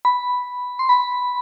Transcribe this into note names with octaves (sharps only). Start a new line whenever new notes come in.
B5
C6
B5